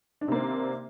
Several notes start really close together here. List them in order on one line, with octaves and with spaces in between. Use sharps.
D4 D#3 C3 A#3 C4